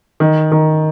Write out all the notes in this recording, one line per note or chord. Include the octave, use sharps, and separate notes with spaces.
D#3
D#3